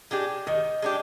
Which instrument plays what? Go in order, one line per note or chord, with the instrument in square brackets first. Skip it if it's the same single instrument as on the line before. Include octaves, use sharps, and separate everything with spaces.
[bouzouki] G#3 D4 G4
[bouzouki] D#3 [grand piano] D#5
[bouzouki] G#3 D4 G4